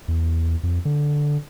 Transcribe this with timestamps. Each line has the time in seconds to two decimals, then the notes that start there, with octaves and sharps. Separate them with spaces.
0.08 E2
0.63 F2
0.85 D3